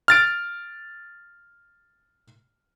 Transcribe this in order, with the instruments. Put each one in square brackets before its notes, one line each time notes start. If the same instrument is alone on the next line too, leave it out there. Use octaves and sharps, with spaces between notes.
[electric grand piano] F6 A6 D7